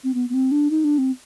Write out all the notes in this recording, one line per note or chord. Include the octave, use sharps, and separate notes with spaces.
C4
B3
B3
C4
D4
D#4
D4
C4